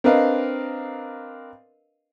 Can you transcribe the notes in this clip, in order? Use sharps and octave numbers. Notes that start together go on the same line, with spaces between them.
C4 D4 A#4 B4 D#5 F5